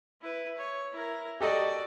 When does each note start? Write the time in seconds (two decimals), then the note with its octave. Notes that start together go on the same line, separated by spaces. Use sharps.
0.21 E4 B4
0.58 C#5
0.92 E4 A#4
1.41 F#4 G4 A4 D5 D#5